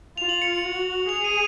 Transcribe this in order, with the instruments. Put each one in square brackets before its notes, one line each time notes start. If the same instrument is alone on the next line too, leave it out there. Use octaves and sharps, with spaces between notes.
[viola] F4 [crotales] F7
[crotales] F#7
C#7
[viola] F#4
[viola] G#4 [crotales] F7
[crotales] D#7